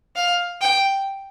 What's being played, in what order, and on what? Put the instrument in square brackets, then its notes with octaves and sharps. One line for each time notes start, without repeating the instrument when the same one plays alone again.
[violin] F5
G5